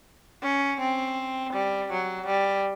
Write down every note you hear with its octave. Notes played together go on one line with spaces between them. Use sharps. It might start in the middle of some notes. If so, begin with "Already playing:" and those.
C#4
C4
G3
F#3
G3